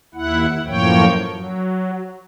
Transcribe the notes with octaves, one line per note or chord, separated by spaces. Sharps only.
D#2 E4 F#5
F#2 A2 F3 A#3 C#5 G5
F#3